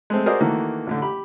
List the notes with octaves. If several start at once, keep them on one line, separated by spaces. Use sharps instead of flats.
G#3 A3 C4
F#4 G#4 A#4 C5 D5 D#5
D#3 E3 A3 A#3 F#4
A1 A2 D3
G4 B5